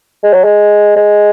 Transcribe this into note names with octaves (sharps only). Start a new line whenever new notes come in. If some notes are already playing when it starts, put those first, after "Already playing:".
G#3
F#3
G#3
G#3